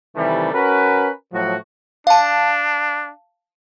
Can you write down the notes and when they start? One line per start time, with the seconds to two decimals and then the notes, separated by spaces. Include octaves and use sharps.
0.15 C3 D#3 E3 G3 A3
0.53 C#4 F#4 A#4 B4
1.32 A2 F3 F#3 F#4
2.07 D4 F5 A5